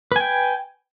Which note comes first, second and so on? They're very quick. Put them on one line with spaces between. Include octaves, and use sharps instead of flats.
B4 G#5 G5